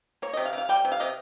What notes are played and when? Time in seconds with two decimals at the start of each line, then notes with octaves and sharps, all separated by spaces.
0.22 A#3 C#5
0.33 D#5
0.37 C3
0.45 F5
0.53 C3
0.58 F5
0.69 G3 G5
0.85 C3
0.92 F5
1.00 C3 D#5